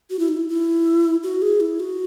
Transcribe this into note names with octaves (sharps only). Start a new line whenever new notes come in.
F#4
E4
D#4
E4
E4
F#4
G#4
E4
F#4